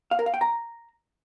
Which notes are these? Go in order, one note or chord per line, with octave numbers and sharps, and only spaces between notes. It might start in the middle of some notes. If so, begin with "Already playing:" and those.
F5
A#4
F5
G5
A#5